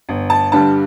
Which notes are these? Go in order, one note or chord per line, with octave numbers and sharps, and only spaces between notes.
G1
A5
G2 D3 G3 A5